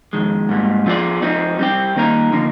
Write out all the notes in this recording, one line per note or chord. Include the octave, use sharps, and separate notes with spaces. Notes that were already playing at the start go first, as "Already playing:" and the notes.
F2 D#3 G#3
G#2 G3 A#3
F3 C4 F4 G#4 D5
F3 C4 D#4
G3 C4 G4
D#3 G3 A#3 D#4 A#4
D3 F3 A#3 D#4